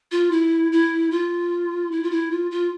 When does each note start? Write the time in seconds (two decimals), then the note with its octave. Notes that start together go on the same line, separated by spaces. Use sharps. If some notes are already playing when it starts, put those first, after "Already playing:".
0.12 F4
0.31 E4
0.72 E4
1.11 F4
1.92 E4
2.03 F4
2.11 E4
2.31 F4
2.51 F4